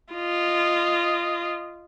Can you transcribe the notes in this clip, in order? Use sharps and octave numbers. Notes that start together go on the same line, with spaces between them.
F4 D#5